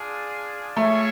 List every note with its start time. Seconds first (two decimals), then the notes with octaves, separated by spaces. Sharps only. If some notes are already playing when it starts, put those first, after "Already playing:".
Already playing: D4 F4 G#4
0.76 A3 F4 G#4 C#5 E5